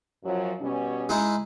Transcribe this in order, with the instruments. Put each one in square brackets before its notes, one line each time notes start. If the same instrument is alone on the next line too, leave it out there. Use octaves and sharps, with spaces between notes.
[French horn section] F#2 F3 F#3
B2 G3 C#4
[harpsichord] G#3 D#4 E4